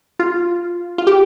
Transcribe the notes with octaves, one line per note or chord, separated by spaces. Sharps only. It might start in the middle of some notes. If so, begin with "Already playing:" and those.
F4
F4
G4